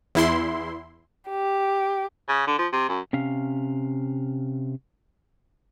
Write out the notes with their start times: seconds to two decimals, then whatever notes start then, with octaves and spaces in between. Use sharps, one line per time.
0.15 E2 E4 C6
1.30 G4
2.29 C#3
2.47 D3
2.59 F3
2.73 C3
2.89 F#2
3.13 C3 C#4 F5